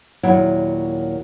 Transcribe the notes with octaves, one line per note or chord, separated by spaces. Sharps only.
D#2 A#2 F#3 E4 C#5 F#5